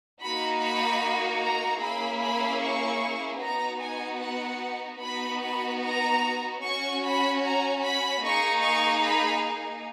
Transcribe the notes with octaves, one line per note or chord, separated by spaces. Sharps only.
A#3 D#4 F#4 B5
B5
A#5
A#3 C#4 E4 G#4 B5
B5
C#6
B3 D#4 F#4 A#5
G#5
F#5
B3 D#4 F#4 B5
B5
A#5
C#4 F#4 C#6
B5
A#5
B5
A#3 D#4 G#4 C#6
C#6
B5